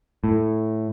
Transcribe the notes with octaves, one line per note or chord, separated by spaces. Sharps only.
A2